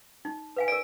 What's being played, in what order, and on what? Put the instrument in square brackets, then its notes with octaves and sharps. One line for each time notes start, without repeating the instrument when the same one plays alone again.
[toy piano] D#4
B4 F5 G#5
[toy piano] A#4 D5 [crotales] D7